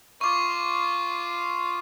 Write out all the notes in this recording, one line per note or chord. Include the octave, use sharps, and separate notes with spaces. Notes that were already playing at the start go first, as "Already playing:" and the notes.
F4 C#6 D6